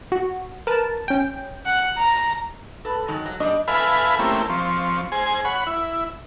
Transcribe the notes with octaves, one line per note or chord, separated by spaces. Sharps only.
F#4
A#4 B4 A5
C#4 G5
F#5
A#5
A4 B4
D#3 F#3 G#3
F#3
G3 D4 D#5
A4 B4 E5 F5 G#5 B5
A3 A#3 C4 C#4 E4 G4
F3 C4 C6 C#6
G#4 C5 G#5
C#5 F#5 B5
E4